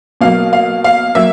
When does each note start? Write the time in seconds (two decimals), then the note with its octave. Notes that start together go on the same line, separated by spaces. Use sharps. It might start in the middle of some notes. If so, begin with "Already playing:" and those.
0.21 B2 F#3 A#3 F5
0.53 F5
0.84 F5
1.15 F#3 A#3 E5